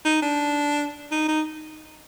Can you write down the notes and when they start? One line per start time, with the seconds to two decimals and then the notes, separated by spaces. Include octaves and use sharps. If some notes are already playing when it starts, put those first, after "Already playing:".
0.05 D#4
0.22 D4
1.11 D#4
1.28 D#4